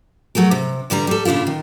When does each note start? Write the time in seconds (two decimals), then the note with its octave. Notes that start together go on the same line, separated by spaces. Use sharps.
0.35 F#3 A3 G#4 A#4
0.51 C3
0.90 G2 D3 G3 A#5
1.07 G3 A4
1.25 A#2 C#3 D4 E4 F4
1.47 D#3